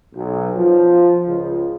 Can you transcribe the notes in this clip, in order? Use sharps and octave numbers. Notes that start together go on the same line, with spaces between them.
B1
F3
C#2